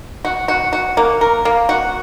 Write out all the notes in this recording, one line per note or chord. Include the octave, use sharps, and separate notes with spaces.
F#4
F#4
F#4
A#3
A#4
A#3
F#4